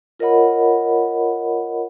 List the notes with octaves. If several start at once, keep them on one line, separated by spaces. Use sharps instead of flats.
F4 A#4 C#5 D#5 F#5 B5